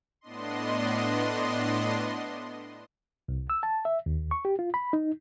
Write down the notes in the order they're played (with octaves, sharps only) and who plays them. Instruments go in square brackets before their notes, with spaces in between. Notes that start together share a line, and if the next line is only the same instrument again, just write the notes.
[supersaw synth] A2 B3 D4 D#5 C6
[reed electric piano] C2
E6
A5
E5
D#2
C#6
G4
F4
B5
D#4